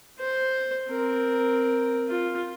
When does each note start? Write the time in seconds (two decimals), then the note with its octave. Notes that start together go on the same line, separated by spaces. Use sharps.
0.19 C5
0.90 C4 A#4
2.08 F4